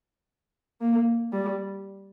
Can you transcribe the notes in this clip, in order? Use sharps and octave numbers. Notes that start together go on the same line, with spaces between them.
A#3
G3